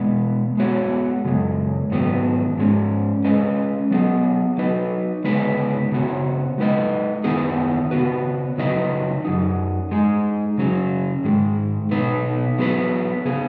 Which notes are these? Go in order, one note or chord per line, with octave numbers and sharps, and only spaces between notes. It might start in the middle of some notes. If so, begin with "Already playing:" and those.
Already playing: B2 G#3 B3
G#3 B3 F#4 C#5
F#2 C#3 G#3
G#2 D#3 F#3 B3
G#2 G#3 C#4
G#3 C#4 B4 D#5
F#3 B3 G#4 D#5
F#3 D#4 F#4 B4 D#5
C#3 G#3 B3 D#4 B4
C#3 B3 F#4 C#5
G#3 D#4 B4 D#5
D#3 B3 D#4 G#4
C#3 B3 F#4 B4
C#3 F#3 D#4 B4 D#5
F#2 F#3 D#4
G#3 D#4 G#4
C#3 F#3 C#4 G#4
G#2 D#3 G#3
B2 B3 D#4 B4
F#3 B3 G#4 B4
C#3 B3 G#4